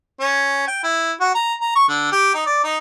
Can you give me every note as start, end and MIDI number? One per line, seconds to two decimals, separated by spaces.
0.20 0.64 61
0.67 0.81 79
0.83 1.12 64
1.20 1.33 66
1.35 1.54 82
1.61 1.71 82
1.76 1.86 85
1.89 2.09 50
2.12 2.33 67
2.34 2.42 63
2.46 2.62 74
2.64 2.77 63